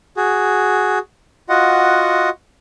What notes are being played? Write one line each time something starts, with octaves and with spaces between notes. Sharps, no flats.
F#4 G#4
F4 F#4 D#5 F#5